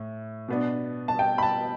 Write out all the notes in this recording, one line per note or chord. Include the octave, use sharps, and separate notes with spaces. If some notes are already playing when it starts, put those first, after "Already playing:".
Already playing: A2
B2 B3 D4
A5
G5
B5
A5